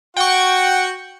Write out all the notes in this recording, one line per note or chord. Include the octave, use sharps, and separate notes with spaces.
F#4 F#5 G5 C#6